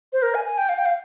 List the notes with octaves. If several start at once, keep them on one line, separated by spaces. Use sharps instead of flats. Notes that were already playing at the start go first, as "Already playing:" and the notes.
C5
A#4
G#5
G#5
G5
F5
G5
F5